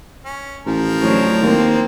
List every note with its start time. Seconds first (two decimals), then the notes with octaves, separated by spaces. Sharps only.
0.25 C#4
0.66 A1 F3 A#4
1.02 A2 F#3 D4 C5 C#5
1.42 D#2 A#3 C4